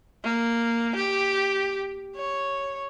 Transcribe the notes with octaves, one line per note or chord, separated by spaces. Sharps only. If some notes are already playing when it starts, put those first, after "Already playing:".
A#3
G4
C#5